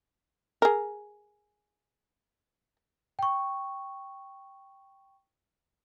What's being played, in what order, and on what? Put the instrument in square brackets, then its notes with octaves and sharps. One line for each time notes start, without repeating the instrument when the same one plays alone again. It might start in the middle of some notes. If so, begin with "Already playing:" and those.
[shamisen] G#4 A#4
[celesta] G5 C#6